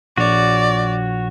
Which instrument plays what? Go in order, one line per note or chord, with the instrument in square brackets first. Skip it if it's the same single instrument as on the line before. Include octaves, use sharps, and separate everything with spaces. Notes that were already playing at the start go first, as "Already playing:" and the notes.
[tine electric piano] A#1 [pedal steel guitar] F#4 C#5 [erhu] D5